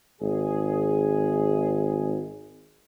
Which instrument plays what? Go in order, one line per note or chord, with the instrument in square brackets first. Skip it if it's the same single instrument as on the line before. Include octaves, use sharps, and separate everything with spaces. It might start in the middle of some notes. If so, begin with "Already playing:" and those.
[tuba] G#1 [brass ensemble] G#4